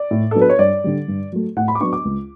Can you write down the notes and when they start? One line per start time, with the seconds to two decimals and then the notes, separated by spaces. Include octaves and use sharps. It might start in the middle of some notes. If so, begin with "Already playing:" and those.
Already playing: D5
0.11 A2
0.31 F#3 B3 D4 A4
0.41 B4
0.50 C#5
0.59 G2 D5
0.84 D3 G3
1.08 G2
1.32 F#3 A3
1.56 A2 F#5
1.68 B5
1.75 D6
1.80 F#3 B3 D4 C#6
1.93 D6
2.05 C#2